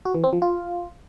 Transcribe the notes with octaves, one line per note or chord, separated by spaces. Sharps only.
F#4
E3
C4
F3
F4